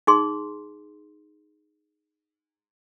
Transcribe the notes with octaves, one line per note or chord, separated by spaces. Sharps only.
D#4 G#4 C6